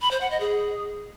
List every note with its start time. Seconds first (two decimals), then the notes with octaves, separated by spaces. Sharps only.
0.01 B5
0.11 C5
0.21 F#5
0.30 D#5
0.40 G#4